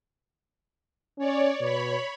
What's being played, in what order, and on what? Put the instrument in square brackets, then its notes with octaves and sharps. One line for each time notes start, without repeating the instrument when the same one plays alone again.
[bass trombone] C#4 [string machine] C#5 D5
[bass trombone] B2 [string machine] C#5 B5